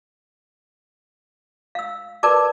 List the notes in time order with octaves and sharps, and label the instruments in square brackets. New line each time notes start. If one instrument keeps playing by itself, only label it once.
[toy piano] F5 E6
A#4 B4 D5 A5 D6